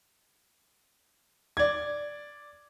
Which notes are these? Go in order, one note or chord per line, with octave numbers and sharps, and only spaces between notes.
D5 G#6